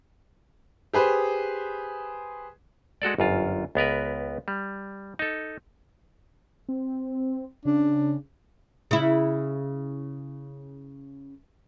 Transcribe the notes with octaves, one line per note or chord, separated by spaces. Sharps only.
G4 G#4 B4 C5
G#3 F#4 A4 D5
G1 F#2 F4
C#2 B3 A#4 B4
G3
D#4 A4
C4
C#3 D4
C#3 E4